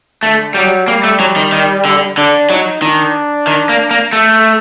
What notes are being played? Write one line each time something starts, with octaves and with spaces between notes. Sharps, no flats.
D3 A3
F#3 G3
G3 A#3
A3
F#3
D#3
D#3
D3
D3 D4
F#3 D#4
D#3 D4
D#3
A#3
A#3
A3